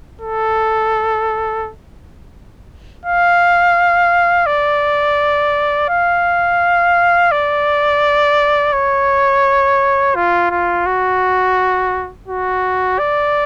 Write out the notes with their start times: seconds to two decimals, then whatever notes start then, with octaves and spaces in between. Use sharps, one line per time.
0.22 A4
3.06 F5
4.46 D5
5.89 F5
7.32 D5
8.73 C#5
10.15 F4
10.51 F4
10.86 F#4
12.28 F#4
12.99 D5